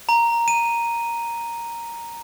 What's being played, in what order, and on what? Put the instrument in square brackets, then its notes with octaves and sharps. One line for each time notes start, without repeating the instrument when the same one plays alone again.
[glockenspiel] A#5
D#7